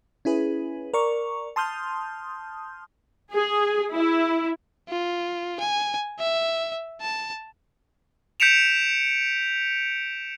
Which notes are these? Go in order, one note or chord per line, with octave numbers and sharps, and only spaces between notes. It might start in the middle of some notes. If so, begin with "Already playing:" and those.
C#4 E4 G#4 B4
A#4 D5 C#6
A5 C6 D#6 F6 G6
G#4
E4
F4
G#5
E5
A5
G6 B6 C#7 D7 E7 F7